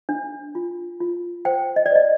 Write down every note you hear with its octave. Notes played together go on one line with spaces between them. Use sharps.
D4
F4
F4
C5 G5
D#5
D5
C5 D#5